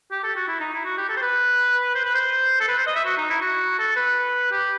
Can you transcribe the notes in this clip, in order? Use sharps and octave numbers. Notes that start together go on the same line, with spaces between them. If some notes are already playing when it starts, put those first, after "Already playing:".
G4
A4
F#4
E4
D#4
E4
F#4
G4
A4
C5
B4
C5
B4
C5
A4
B4
C5
D#5
E5
F#4
D#4
E4
F#4
A4
B4
G4